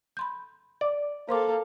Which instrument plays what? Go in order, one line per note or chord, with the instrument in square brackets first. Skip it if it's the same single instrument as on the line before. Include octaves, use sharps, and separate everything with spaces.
[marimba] B5 C6 G6
[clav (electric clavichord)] D5
[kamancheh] A#3 A4 [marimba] C5 C6 D6